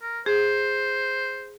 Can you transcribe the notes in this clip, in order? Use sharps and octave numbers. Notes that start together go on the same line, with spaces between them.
A#4
G#4 C5